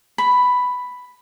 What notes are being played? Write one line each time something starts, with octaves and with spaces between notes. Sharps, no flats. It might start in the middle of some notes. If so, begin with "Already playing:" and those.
B5